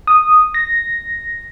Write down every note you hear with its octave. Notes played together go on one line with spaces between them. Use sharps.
D#6
A#6